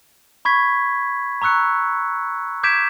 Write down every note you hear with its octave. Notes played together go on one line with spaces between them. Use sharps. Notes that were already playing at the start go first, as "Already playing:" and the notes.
B5 C#6 G#6 B6
A#5 C#6 E6 F#6 C#7
D6 G6 G#6 B6 D7 E7